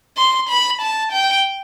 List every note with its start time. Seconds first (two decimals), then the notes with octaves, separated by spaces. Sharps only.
0.17 C6
0.49 B5
0.81 A5
1.12 G5